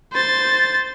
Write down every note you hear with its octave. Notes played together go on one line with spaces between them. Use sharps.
C5 A6